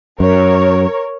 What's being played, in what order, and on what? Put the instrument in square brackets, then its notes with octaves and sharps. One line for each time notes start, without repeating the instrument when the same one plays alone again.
[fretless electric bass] F#2 [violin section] A#4 C#5